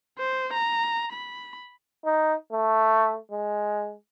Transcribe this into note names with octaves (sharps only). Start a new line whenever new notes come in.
C5
A#5
B5
D#4
A3
G#3